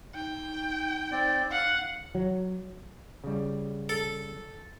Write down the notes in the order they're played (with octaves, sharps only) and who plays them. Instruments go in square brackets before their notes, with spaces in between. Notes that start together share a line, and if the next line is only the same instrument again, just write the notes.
[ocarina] D#4 [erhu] G5
[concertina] C4 D5
[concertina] F5 [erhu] F#5
[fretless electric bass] F#3
[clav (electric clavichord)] C#3 G3
[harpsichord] A4